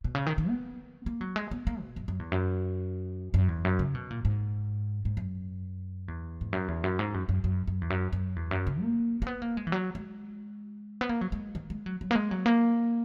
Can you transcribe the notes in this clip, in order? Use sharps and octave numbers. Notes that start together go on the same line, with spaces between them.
B2
C#3
D#3
D#3
B3
A#3
F#3
G#3
B3
A#3
B2
F#2
F#2
E2
F#2
F#2
E2
F#2
C#3
B2
A#2
G#2
G#2
F#2
E2
G#2
F#2
E2
F#2
G#2
F#2
F#2
F#2
F#2
E2
F#2
F#2
E2
F#2
C#3
A#3
A#3
B3
A#3
G#3
E3
F#3
G#3
B3
A#3
F#3
G#3
D#3
G#3
F#3
F#3
A#3
G#3
F#3
A#3